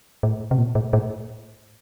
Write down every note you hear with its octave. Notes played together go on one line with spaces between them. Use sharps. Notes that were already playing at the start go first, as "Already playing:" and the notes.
A2
C3
A#2
A2
A2